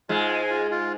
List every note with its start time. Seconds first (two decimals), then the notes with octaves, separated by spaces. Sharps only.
0.09 G#2 G#3 F4
0.30 G#5
0.50 F4
0.71 F4